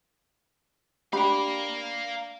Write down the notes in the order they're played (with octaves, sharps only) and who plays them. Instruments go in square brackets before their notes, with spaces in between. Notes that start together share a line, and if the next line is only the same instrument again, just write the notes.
[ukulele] D4 G4 B5 [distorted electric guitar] F5 A#5